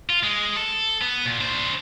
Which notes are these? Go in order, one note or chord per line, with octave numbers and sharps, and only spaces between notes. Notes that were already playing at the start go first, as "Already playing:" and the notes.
F4
G#3
A4
B3
A#2
D4 C5